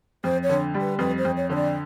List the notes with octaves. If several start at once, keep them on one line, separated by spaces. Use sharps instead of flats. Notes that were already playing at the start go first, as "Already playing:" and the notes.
F2 C5
C#5
D3
G3
B4
F2 B4
C5
F2
C#5
D3 C#5
D5